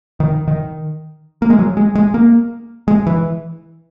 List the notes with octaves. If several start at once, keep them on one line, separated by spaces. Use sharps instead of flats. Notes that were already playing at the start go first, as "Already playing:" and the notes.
D#3
D#3
A#3
G#3
F#3
G#3
G#3
A#3
G#3
E3